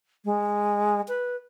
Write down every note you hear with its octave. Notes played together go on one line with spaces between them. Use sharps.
G#3
B4